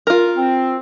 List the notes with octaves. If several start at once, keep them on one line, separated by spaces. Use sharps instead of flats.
F4 A#4
C4